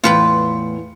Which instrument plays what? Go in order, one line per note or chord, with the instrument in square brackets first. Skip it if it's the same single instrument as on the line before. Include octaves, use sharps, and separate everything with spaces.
[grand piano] E2 A2 C#7 [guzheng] F4 B4 G5